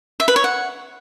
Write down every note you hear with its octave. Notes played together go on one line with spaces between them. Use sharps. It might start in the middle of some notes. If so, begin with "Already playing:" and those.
E5
B4
C#5
F#5